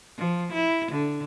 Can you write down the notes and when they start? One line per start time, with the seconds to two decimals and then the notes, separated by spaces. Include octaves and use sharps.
0.17 F3
0.53 E4
0.92 D3